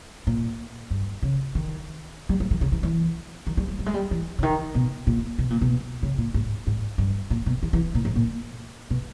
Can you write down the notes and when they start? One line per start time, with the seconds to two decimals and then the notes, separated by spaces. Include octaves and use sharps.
0.27 A#2
0.91 G2
1.23 C#3
1.55 D#3
2.29 G3
2.40 G3
2.51 D#3
2.61 C#3
2.72 E3
2.83 E3
3.47 D#3
3.57 G3
3.68 G3
3.79 G3
3.86 G#3
3.94 G3
4.11 E3
4.39 C#3
4.43 D#3
4.74 B2
5.07 A#2
5.38 B2
5.50 A#2
5.61 B2
6.03 C#3
6.18 A#2
6.34 G#2
6.67 G#2
6.98 G2
7.30 A#2
7.46 B2
7.63 D#3
7.73 E3
7.95 A#2
8.05 G#2
8.15 A#2
8.90 B2